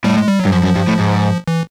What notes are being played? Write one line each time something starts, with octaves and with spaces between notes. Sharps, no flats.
A2 G3
G#3
G3
F#3
G2
F#2 F3
F#2
G2
A2
G#2
E3